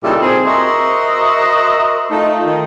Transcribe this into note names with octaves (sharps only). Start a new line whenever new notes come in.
A#2 C#3 G3 D#4 E4 A4
C4 G#4
F#4 A#4 C5 D#5 E5
A3 D#4 F4
D#3